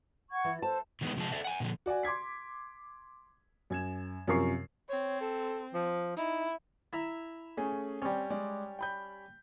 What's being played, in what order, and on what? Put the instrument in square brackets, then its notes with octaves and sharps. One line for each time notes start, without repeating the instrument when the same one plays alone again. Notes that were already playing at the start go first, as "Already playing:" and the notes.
[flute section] F#5 C#6 G#6
[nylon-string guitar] E3
[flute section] A4 C5 [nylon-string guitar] A5
[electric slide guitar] D#3 E3 G#3 A#3 B3
C3 F3 G#3 A5
A4 D5 E5
F#5 G#5
A#2 D3 E3 F3
[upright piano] F#4 D5 F#5 G#5
C6 D6 G#6 B6
F#2 G#6 E7
F#2 C3 F3 A#4 C#6 C7
[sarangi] C4 [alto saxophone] C#5
[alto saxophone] A4
F3
[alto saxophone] D#4 [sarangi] E4
[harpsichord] E4 E5 A#5
[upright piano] A3 C#4 G#4
[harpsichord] G3 C#4 [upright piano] C4
[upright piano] G#3 D5
G5 B5 G6